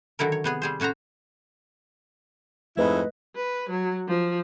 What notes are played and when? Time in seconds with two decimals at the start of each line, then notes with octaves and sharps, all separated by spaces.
0.19 D3 D#3 F#3 E4 A#4
0.32 C#5
0.44 C3 B3 G#4
0.62 G3 G#4 C5
0.80 A2 C#4 F#4 C5 A#5
2.77 F2 G#2 A3 E4 B4 D#5
3.36 B4
3.70 F#3
4.08 F3